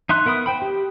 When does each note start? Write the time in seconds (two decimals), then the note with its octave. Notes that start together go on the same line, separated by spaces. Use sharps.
0.09 D#4 E5 C6 F#6
0.26 B3 A#4 E5 B5 D#6
0.46 C5 G5 B5
0.62 G4